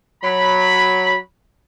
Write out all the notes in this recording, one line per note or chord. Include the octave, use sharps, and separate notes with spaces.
F#3 B5